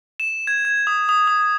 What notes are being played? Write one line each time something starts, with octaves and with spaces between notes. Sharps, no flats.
E7
G#6
G#6
D#6
D#6
D#6